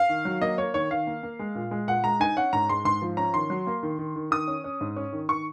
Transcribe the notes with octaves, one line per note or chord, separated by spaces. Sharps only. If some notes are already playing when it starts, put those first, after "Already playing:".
Already playing: F5
D#3
F#3
A#3 D#5
A#3 C#5
D#3 C#5
D#3 F5
A#3
A#3
G#3
A#2
G#3
A#2 F#5
G#3 A#5
D#4 G#5
C#4 F#5
G#2 A#5
G#3 C6
G#2 C6
F3
C#4 A#5
D#3 C6
F#3
A#3
D#3
D#3
D#3
D#3 D#6
C#4
C#4
G#2
C#4
D#3
D#3 C#6